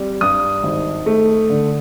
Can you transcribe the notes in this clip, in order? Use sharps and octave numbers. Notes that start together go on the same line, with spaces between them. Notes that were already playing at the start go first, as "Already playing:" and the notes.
Already playing: G3 C4
G2 D#6
G#1
A3
D3